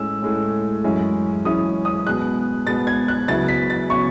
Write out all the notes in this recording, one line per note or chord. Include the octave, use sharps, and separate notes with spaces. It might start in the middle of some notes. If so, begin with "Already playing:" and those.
Already playing: A2 G#3 C#4 E6
A2 G#3 C#4
F#2 E3 G#3 C#4 E4
F#2 E3 G#3 C#4 E4 D#6
D#6
B2 G#3 B3 F#6
B2 G#3 B3 A6
G#6
F#6
C#3 F#3 B3 E4 A6
B6
A6
C#3 F#3 B3 E4 C#6